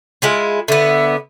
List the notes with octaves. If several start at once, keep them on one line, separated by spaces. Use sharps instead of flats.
G#3 E4 F4
D3 B3 E5